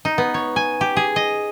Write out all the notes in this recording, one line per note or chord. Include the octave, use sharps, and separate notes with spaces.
D#4
B3
C#5
G#5
G4
G#4
D#5